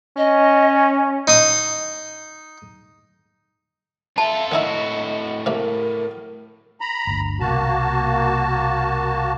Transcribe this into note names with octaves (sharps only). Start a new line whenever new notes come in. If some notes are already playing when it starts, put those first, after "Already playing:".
C#4 D#5
D#4 D#6
F4 A4 E5 A5
A2 D#3 D#4 E4 F#4 D#5
C3 A#3 A#4
A#5 B5
G1 D2
C2 B2 A#3 F#4 A5